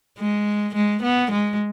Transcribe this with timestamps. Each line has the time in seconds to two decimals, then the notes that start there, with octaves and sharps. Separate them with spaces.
0.19 G#3
0.75 G#3
1.02 B3
1.31 G#3